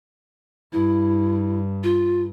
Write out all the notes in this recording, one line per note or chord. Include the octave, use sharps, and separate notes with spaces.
G2 E4
F4